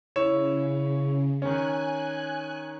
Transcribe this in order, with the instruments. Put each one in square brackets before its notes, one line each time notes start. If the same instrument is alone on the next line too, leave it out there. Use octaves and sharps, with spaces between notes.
[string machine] C#3 [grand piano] E4 C#5 E7
[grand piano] D#3 C#4 [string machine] G#5 F#6